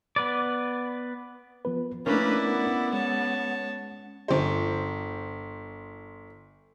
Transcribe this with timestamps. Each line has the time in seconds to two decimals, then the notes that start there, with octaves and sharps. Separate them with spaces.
0.16 B3 B4 D5
1.65 F3 B3 B4
2.06 A3 A#3 C#4 D4 E4 A#4 B4 D5
2.43 B3
2.93 G#3 C#5 A5
4.28 G1 C5